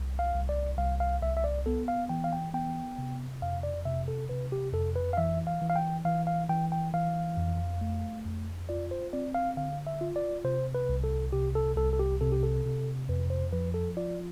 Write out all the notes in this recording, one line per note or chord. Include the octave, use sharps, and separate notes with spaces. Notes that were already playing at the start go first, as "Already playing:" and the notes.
Already playing: C2
F5
C2
D5
C2 F5
F5
C2 E5
E5
D5
B3 A4
F5
E3 G5
F5
G5
B3 G5
C3
F2 F5
D5
C3 E5
A4
C3 B4
G4
F2 A4
B4
F5
E3 E5
F5
E3
F5
G5
E3 F5
F5
E3 G5
G5
E3 F5
F2
A3
F2
F4 D5
C5
C4 D5
F5
D3 F5
E5
F4
D5
C3 C5
B4
C2
A4
C3 G4
A4
C2 A4
A4
G4
C3 A4
G4
A4
C3
F2 B4
C5
F3 B4
A4
F4 D5